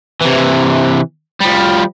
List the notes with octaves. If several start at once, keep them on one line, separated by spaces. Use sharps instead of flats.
C3 E3
F3 G3